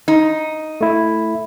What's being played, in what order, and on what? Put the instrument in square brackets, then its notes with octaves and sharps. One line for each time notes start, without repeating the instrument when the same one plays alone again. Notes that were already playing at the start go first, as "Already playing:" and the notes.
[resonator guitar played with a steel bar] D#4
[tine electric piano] A3 E4